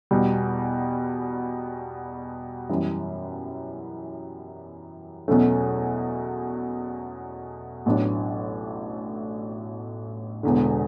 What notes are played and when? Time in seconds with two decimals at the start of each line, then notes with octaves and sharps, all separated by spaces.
0.11 E2 B2 G3
2.69 F#2 E3 G3
5.28 E2 B2 F#3 A3 C#4
7.86 A1 A2 F#3 B3 D4
10.43 E1 E2 D3